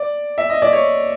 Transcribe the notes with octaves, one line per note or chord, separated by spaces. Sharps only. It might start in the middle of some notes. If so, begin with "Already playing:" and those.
Already playing: D5
E5
D#5
D5
C#5